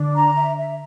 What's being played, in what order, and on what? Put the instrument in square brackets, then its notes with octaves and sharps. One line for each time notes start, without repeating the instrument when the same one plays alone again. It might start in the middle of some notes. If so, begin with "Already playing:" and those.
Already playing: [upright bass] D3 [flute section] D4
[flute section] A#5
E5
E5